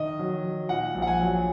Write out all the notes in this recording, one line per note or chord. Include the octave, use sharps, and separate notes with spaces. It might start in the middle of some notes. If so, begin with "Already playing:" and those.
Already playing: D#3 D#5
F#3
F#3
A#2 F#5
A#1
F#5
G#5
F#3